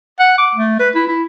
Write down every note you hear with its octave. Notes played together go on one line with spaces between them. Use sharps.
F#5
D6
A3
B4
E4
E4